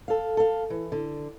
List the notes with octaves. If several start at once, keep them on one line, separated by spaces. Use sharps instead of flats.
A4 F5
A4 F5
E3
D3